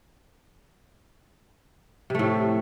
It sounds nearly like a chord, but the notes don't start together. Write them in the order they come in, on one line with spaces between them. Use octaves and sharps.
C3 A3 A2